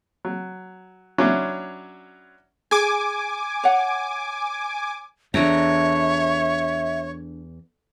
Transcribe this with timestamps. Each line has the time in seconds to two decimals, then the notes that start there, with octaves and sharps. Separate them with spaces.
0.25 F#3
1.18 F#3 C#4 D4 E4
2.71 G#4 G#5 D6
3.64 C#5 F#5
5.34 E2 D4 A4 C#5 E5 A#5